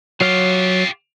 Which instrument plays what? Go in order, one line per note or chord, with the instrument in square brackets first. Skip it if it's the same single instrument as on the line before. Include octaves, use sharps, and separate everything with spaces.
[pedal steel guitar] F#3 C#5 F6 [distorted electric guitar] F4 G4